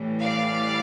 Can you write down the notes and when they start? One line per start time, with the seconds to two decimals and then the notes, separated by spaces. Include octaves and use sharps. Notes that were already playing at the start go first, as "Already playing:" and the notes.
Already playing: A2 E3 G3
0.20 D5 F5